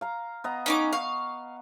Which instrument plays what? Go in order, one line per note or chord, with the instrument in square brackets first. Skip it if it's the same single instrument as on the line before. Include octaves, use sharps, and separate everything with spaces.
[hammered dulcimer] F5 A#5
B3 D#5 A#5
[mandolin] C#4 D#4 D6
[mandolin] F5 [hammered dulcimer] C#6